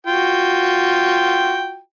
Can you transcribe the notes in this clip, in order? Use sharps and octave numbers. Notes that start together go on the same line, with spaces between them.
F4 F#4 G5